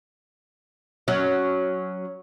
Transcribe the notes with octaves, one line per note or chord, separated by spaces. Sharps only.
F#3 C#4